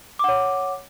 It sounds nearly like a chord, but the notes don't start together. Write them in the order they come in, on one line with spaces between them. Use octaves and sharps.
D6 F#5 C#5